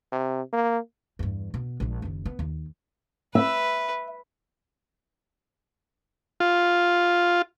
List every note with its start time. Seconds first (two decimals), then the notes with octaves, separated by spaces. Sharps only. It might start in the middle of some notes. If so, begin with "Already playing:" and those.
0.12 C3
0.53 A#3
1.19 E2 G2
1.54 B2
1.80 A#1 G#3
2.02 F#1 D#3
2.26 B3
2.39 D#2
3.35 B4 E5
6.40 F4